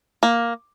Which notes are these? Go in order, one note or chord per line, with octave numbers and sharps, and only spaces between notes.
A#3